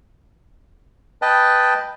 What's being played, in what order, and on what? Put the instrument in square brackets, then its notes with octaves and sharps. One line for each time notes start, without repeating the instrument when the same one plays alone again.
[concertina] B4 D#5 G5 A5